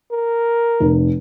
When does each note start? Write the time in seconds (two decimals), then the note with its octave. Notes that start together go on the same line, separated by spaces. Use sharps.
0.12 A#4
0.80 F1